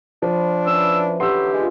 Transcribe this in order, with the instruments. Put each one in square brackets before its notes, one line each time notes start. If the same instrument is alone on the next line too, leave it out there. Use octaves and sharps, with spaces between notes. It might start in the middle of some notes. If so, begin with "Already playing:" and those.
[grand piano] F3 [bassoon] D4 [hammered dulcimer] C5 B5
[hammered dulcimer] C#4 E4 B4 [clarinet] E6
[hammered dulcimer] D3 E3 [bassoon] F#3 [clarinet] G4 [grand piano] C6 E6
[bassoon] G#3 [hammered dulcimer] F4 E5